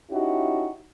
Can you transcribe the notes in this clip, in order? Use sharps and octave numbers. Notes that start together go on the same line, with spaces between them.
C#4 D#4 E4 F#4 G4